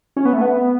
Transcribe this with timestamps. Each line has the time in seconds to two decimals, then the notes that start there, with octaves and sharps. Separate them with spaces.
0.17 C#4
0.25 B3
0.33 A3
0.41 B3